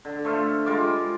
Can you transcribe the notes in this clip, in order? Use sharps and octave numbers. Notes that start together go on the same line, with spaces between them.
D3
A3 C5 E5 F5
G3 G#3 F4 D6